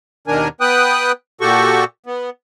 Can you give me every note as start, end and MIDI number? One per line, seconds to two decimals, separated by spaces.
0.27 0.48 39
0.27 0.48 47
0.27 0.48 51
0.27 0.48 62
0.27 0.48 70
0.27 0.48 80
0.61 1.12 59
0.61 1.12 71
0.61 1.12 79
0.61 1.12 87
0.61 1.12 90
1.41 1.84 46
1.41 1.84 66
1.41 1.84 67
1.41 1.84 69
1.41 1.84 85
2.06 2.30 59